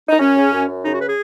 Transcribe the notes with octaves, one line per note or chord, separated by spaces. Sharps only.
D#4
F#2 C#4
C#3
F#2
F#2
C#3 D#4
F#4
B4
G#4